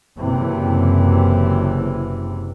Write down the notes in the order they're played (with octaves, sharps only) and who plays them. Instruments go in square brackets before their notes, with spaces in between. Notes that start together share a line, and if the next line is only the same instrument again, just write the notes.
[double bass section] F#1 C3 E3